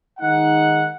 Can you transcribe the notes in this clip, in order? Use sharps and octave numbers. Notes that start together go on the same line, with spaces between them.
D#3 G#3 D#4 F#5